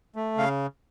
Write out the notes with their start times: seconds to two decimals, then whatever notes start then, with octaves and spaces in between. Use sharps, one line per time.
0.16 A3
0.37 C#3 F5